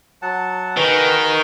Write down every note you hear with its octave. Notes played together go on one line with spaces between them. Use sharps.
F#3 F#5 A5
D#3 F#4 G#4 B4 D#5